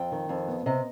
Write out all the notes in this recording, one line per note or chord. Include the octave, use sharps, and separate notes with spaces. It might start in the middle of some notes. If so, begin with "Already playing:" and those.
Already playing: F2 G5
D#3
F2
B3
C3 D#5